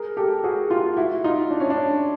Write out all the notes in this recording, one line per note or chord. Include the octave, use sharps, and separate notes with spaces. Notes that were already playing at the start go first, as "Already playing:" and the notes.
Already playing: G#4 A#4
G4 A4
F#4 G#4
F4 G4
E4 F#4
D#4 F4
D4
C#4
D4